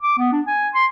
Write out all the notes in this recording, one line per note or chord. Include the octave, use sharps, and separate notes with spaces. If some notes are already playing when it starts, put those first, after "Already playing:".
D6
B3
D4
G#5
C6